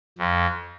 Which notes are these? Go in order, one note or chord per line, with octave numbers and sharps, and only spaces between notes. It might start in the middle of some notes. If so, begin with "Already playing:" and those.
F2